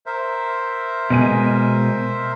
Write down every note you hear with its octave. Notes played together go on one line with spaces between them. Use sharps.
A#4 C5 E5
B2 G#3 G#5